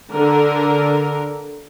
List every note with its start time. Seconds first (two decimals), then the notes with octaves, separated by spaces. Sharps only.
0.14 D3 A#4